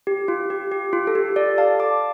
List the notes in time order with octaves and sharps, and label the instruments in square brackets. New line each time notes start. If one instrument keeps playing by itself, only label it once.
[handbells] G4
F4
G4
G4
F4
A4
G4
A4 D5
F5 A5
A5 D6